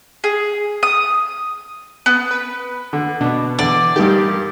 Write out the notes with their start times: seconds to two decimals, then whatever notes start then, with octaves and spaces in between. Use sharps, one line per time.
0.24 G#4
0.83 D#6
2.06 B3
2.31 B4
2.93 D3
3.21 B2 B3 D4
3.59 E2 D3 D5
3.96 G2 D#3 G4